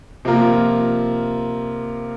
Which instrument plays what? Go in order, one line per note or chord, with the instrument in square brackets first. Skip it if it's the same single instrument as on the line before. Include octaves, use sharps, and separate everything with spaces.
[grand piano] C3 F3 A#3 F4 A#4